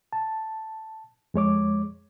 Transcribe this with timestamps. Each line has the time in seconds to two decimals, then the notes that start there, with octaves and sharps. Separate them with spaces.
0.13 A5
1.34 F2 G#3 C#5 D6